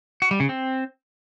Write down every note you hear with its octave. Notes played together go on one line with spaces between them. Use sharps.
F#4
G3
C#3
C4